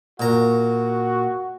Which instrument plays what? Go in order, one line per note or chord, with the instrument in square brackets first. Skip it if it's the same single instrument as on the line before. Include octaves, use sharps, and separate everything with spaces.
[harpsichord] A#2 A#5 [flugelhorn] F#4